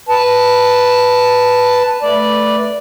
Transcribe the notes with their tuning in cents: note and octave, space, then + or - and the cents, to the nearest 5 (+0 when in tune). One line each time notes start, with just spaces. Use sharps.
B4 +0 A5 +0
A3 +0 B4 -15 D5 +0